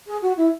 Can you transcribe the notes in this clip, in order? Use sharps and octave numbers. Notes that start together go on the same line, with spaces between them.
G#4
F#4
E4